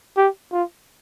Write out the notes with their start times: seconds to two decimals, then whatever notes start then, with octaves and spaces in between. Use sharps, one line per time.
0.17 G4
0.52 F4